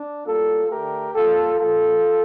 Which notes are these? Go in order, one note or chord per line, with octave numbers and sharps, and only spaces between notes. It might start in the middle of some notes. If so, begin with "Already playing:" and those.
Already playing: D4
A2 G3 A#3 F4 A4
D3 A3 G4 A#4
A#2 G3 A#3 F4 A4
A#2 F3 A#3 F4 A4